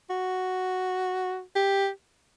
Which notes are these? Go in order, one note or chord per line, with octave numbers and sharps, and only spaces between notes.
F#4
G4